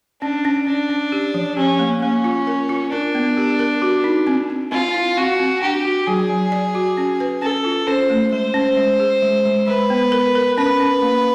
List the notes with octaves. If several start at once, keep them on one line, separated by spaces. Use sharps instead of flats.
C#4 D4
C#4
C#4 D4
C#4
G4
F3
C#4 G4
A#3
A#3 C#4
F4
A#4
F4
D4 A#4
B3
G4
A#4
F#4
D#4
C4
C4
C4 F4
E4
C4 F#4
C4
D4 G4
F#4
F#3 G#4
F#3
D5
F#4
C#4
B4
C#4 A4
F4
C#4 C5
A3
G#3 C5
C#4
G#3
G#4
G#3
G#3
G#3 B4
B3
A#4
A#4
C#4 B4
C#4
A#3